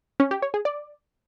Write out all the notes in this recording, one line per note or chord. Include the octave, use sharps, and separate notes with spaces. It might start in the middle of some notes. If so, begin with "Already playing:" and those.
C#4
G4
C#5
G#4
D5